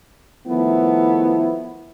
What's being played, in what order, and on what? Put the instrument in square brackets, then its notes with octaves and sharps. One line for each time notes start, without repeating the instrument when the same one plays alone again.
[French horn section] D#3 F3 A3 B3 E4